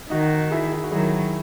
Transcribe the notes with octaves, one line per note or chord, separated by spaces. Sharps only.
D#3 D#4 F#4
E4 G#4
E4
F#4
D#3 F#3 E4 G#4